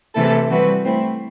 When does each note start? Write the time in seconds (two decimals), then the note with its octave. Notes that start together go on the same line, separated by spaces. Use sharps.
0.15 C3 E3 A3 E4 A4
0.50 E3 G3 C4 F#4 B4
0.84 A3 C4 E4